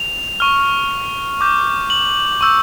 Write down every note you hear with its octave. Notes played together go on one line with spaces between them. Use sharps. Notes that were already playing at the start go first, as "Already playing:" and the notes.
Already playing: F7
C#6 F6
D6 G6
F#7
C#6 E6 G6